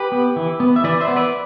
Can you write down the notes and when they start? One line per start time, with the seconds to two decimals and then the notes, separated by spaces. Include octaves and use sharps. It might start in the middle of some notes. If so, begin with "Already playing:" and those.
Already playing: G4 B4
0.12 B3
0.36 E3
0.60 B3
0.76 E5
0.84 E3 B4 D5
1.01 C5 E5
1.08 B3
1.16 B4 D5